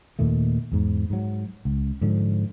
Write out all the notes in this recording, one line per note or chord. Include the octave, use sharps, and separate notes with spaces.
D#2 A#2 D#3 A3
E2 G#2
G#2 F#3
C#2
G#2 D3 F3